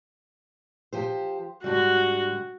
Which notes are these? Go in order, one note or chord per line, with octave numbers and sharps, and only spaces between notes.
F3 G4 C5
G#2 D3 G3 F#4